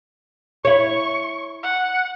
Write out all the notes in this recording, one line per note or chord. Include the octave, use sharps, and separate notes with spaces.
E4 C#5 C#6
F#5